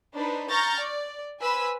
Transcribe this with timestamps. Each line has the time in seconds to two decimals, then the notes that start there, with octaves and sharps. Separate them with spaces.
0.15 D4 D#4 B4 C5
0.50 A#5 C#6 F6 G6 A6 A#6
0.80 D5
1.42 B4 C5 G#5 B5 E6